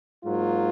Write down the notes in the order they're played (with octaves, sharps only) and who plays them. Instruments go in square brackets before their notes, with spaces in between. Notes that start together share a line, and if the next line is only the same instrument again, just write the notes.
[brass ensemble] G#2 F#3 A#3 F4